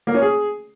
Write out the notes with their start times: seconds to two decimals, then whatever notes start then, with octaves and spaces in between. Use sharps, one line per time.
0.07 A#3
0.14 C#4
0.22 G#4